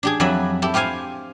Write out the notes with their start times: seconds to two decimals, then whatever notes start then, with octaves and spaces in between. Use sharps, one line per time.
0.03 D4 G4 G#4
0.20 F2 F#3 D5 E5 B5
0.62 E4 G4 A4
0.74 F4 G4 C5 F5 G#5